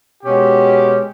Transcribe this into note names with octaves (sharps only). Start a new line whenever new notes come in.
B2 G#3 C#4 G4